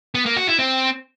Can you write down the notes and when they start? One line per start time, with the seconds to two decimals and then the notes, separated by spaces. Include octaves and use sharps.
0.15 B3
0.26 A#3
0.37 F#4
0.48 E4
0.59 C4